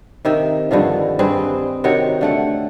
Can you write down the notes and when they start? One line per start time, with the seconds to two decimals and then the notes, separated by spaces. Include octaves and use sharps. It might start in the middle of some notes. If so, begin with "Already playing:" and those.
0.25 C3 D#3 E5
0.71 G2 D3 D#3 F3
1.19 G2 C4 G#4 B4
1.84 C3 D#3 F#4 C#5
2.21 D3 A3 F#5